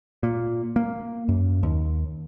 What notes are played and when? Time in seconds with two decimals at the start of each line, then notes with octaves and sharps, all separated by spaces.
0.23 A#2
0.76 A#3
1.29 F#2
1.63 D#2